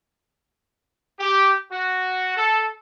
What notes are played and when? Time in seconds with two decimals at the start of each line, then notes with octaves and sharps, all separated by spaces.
1.20 G4
1.72 F#4
2.37 A4